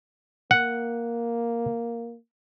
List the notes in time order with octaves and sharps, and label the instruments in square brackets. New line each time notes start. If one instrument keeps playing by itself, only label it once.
[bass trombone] A#3 [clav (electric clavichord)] F#5